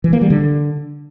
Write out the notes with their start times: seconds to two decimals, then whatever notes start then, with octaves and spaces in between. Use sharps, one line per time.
0.04 E3
0.13 A#3
0.22 G3
0.30 D3